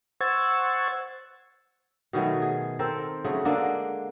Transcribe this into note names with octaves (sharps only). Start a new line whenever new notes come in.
C5 F#5 C#6 E6 G#6 A6
B2 D#3 F#3 A3
G#4
C4 A4 A#4 C5
C#3 F#3 A3
D3 G#3 A#3 D4